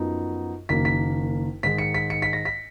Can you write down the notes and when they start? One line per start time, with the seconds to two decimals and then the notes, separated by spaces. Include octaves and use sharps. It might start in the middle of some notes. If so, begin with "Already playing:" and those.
Already playing: F#2 F3 B3 D#4
0.69 F#1 F#2 D#3 A#3 B6
0.85 B6
1.63 G#2 D#3 G#3 B6
1.78 C#7
1.94 B6
2.10 C#7
2.22 B6
2.33 A#6
2.45 B6